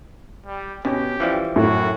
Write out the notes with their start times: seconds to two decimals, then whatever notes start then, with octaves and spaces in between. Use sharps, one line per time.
0.46 G3
0.85 B2 C#4 G4
1.20 E3 F3 G3
1.56 F#2 A2 F#3 F#4